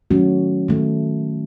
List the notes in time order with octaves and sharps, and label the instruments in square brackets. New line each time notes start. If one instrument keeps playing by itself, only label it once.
[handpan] D#3 F#3 A3 C#4 F#4
D#3 F#3 A3